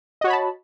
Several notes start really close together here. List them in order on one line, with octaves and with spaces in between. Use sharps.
D#5 F#4 C#5 B5 A5